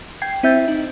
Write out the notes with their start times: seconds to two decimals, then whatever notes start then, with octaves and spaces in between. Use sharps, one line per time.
0.22 G5 G#6 C7
0.43 C4 E4 E5 G6 A6
0.68 D#4